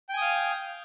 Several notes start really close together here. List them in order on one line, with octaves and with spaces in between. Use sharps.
G5 G#5 D#6 F5